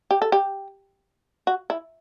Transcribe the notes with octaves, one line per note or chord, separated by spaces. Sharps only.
G4
A4
G4
F#4
E4